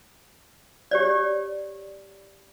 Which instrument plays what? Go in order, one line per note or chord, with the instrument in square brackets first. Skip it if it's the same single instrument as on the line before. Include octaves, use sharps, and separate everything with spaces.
[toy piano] G4 C#5 D5